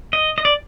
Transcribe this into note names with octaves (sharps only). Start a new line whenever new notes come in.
D#5
D#5
D5